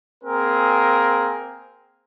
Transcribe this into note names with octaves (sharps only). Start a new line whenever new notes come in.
A#3 C4 G#4 A#4